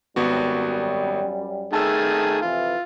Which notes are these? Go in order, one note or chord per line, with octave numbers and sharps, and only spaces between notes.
G#1 F#2 G3 B3 F#4
D#3 A3 G#4 A5 E6
F2 C3 E3 F4